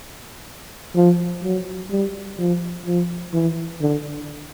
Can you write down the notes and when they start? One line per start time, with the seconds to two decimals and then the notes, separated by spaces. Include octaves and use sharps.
0.96 F3
1.44 F#3
1.91 G3
2.39 F3
2.86 F3
3.33 E3
3.81 D3